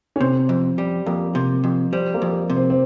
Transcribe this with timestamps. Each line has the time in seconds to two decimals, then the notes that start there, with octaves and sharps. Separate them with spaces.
0.16 C#4
0.20 C3 C4
0.49 F2
0.78 G3
1.06 F2 A#3
1.35 C3
1.64 F2
1.93 G3 C4
2.14 A#3
2.22 F2
2.49 C3
2.57 C4
2.70 C4